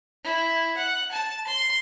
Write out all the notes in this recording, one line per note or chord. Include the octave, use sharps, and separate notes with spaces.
E4
F#5
A5
C6